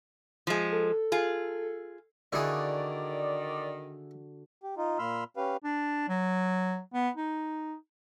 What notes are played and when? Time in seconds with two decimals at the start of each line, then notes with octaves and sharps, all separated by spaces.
0.47 F3 G#3
0.72 A4
1.12 F4 G#4
2.33 D3 D#3 E4 F#4 G#4 D5 C#6
4.63 G4
4.77 D#4 F4
4.99 A#2 A#3 B5 C6 E6 F6
5.37 C#4 G4 B4 F5
5.64 D4
6.09 F#3
6.94 B3
7.16 D#4